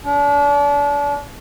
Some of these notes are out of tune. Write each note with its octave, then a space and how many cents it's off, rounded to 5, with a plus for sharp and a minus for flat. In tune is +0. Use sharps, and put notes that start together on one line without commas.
D4 -35